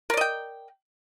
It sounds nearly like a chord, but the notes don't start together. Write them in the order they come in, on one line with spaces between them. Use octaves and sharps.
A#4 D5 D#5 G5